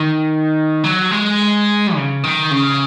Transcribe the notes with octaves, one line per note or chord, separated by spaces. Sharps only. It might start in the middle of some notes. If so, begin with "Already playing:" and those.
Already playing: D#3
F#3
G#3
C#3
D#3
C#3